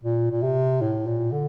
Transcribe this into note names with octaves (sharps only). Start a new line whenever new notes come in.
A#2
A#2
C3
A2
A#2
D3